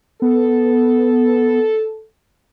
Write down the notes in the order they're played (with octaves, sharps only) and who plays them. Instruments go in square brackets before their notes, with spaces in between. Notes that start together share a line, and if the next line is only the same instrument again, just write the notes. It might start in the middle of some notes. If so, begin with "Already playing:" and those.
[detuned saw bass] B3 [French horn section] A4